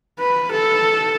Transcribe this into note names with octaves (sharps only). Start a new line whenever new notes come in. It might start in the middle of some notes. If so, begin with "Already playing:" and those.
B4
A4